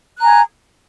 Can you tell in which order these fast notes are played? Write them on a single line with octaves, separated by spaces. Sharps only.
F#6 A#5 G#5